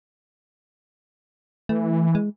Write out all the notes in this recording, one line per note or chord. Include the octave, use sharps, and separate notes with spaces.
E3 A3
G#3